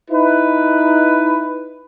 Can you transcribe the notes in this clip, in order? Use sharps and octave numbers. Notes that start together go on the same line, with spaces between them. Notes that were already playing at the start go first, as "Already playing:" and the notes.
D#4 E4 B4